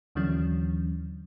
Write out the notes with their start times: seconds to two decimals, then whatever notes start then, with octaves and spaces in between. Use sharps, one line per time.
0.15 D#2 D3 E3 F#3 C#4